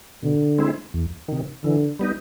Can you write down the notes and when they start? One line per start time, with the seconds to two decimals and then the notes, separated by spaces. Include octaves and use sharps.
0.23 B2 D3
0.59 G#3 C4 E4
0.94 E2
1.28 C3 D#3
1.64 D3 E3
1.99 G3 B3 D#4